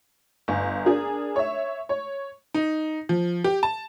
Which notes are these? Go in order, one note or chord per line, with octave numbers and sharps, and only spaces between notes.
G1 G#5
D4 G#4 A#4
C#5 E5
C#5
D#4
F3
G4
A5